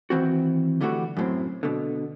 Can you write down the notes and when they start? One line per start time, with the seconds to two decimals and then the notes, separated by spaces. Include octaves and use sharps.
0.10 D#3 E3 C4 F#4
0.81 D3 E3 G3 A3 F#4
1.17 F#2 A2 C4
1.63 B2 D3